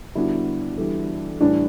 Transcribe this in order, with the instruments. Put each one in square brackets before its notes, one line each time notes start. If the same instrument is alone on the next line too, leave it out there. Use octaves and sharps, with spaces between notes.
[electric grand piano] D3 G3 B3 D4 F#4 [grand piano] E4
[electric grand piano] E3 G3 D4 A4
[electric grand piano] A2 E3 G3 [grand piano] D4